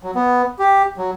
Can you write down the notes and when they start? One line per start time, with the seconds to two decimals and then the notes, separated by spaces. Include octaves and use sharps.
0.03 F#3
0.15 B3
0.59 G4
0.97 F#3